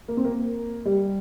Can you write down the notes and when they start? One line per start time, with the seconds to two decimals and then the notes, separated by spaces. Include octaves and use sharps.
0.08 A#3
0.17 C4
0.25 A#3
0.85 G3